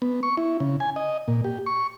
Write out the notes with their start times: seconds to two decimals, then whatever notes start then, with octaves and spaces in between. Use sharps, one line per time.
0.02 B3
0.23 C#6
0.37 E4
0.60 C#3
0.80 G#5
0.96 D#5
1.28 A#2
1.44 G4
1.66 C#6